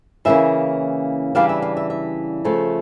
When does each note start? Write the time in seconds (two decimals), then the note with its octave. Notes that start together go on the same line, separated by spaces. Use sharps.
0.25 C#3 E3 A#3 C#4 E5
1.35 C#3 E3 G3 D4 F5
1.49 E5
1.62 F5
1.77 E5
1.90 E5
2.45 C#3 F3 A3